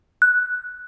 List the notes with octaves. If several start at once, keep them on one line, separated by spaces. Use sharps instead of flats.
F#6